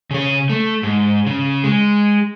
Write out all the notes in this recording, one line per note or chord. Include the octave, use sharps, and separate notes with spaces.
C#3 C#5
A3
G#2
C#3
G#3